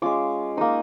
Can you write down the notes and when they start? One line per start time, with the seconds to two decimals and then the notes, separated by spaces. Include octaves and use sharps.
0.02 G#3 C#4 F4 D6
0.57 A#3 D#4 D#6